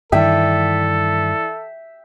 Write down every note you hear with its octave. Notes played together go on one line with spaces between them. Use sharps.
G2 D#3 E3 D4 A4 E5 G5